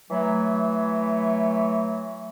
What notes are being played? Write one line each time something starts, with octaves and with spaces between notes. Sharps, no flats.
E3 F#3 A3